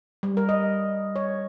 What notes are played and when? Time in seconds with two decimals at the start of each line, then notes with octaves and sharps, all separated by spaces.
0.23 G3
0.37 A#4
0.49 D#5
1.16 C#5